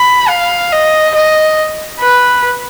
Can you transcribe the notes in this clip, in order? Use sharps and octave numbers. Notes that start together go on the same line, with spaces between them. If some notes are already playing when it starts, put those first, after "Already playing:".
Already playing: B5
F5
D#5
D#5
B4